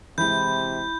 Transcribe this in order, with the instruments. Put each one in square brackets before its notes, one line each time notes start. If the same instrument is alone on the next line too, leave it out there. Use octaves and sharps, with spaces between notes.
[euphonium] C3 [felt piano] E3 G#3 [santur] E4 [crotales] G6